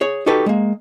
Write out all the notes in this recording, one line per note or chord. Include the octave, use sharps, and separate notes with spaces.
G#4 C#5
D#4 F#4 G4 A4 B4
G#3 A#3